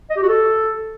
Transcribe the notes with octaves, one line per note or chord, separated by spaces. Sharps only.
D#5
G4
F#4
A4